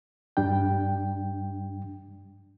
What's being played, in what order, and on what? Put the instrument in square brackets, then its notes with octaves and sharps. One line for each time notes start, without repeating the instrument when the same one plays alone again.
[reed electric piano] G2 G3 D4 G5